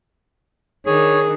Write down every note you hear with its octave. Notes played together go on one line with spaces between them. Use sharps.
D#3 D4 G#4 C#5